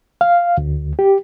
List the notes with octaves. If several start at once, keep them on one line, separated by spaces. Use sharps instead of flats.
F5
D2
G4